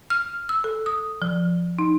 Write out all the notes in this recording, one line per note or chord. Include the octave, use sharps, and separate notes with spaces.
F6
E6
A4
D#6
F3
D#4